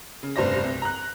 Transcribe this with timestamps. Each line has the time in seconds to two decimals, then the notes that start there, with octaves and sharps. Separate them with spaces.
0.23 C#3
0.36 F1 G2 C5 D5 A#6
0.64 C2
0.82 A#5 F#6